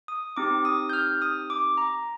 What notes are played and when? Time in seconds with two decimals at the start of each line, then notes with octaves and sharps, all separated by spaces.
0.08 D#6
0.37 C4 D#4 G4 D6
0.65 D#6
0.89 G6
0.93 F6
1.22 D#6
1.50 D6
1.77 A#5